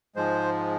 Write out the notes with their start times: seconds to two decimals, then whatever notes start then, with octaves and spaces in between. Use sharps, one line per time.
0.15 G#2 F3 G#3 C5